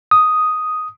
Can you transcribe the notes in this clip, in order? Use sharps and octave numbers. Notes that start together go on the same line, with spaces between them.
D#6